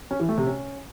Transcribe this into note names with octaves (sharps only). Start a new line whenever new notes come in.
C#4
E3
A3
C3
C#4